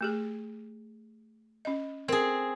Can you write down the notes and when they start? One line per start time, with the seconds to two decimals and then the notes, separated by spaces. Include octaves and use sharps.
0.01 A3 G4 G#4
1.65 C#4 D#5
2.08 C4 G#4 A#4